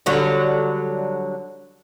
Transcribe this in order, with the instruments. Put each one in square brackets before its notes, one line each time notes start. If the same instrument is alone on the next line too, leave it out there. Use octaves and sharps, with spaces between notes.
[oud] D3 F#3 G3